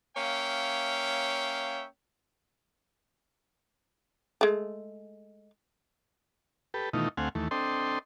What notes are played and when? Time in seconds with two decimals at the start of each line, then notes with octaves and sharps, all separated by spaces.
0.17 A#3 C#4 C#5 E5 F5 G5
4.41 G#3 A3
6.74 G4 A4 B4
6.93 B2 D#3 E3 A3 D#4 F4
7.17 D2 A3 C4 F5 F#5 G#5
7.35 D#2 E3 A3
7.51 C4 D4 A4 D#5 G5 C6